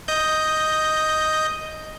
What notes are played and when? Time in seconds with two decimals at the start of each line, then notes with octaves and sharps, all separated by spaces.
0.08 D#5 G6